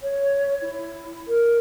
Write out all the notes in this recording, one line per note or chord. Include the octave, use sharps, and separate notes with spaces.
C#5
E4
A#4